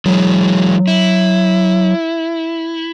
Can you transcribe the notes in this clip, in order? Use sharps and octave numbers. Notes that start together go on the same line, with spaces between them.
E3 F#3 G#3
E4